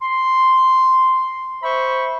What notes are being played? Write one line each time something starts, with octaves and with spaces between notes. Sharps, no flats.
C6
C5 E5 B5 C#6